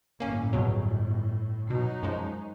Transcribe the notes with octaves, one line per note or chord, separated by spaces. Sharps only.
G1 A2 A#3 C#4
E2 B2 F#3
B2 F#3 D#4
F#2 F3 G#3